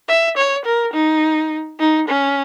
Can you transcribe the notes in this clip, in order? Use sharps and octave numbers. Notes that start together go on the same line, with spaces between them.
E5
C#5
A#4
D#4
D#4
C#4